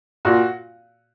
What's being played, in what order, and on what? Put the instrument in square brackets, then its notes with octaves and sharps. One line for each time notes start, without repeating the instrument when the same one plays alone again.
[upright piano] A#2 F#4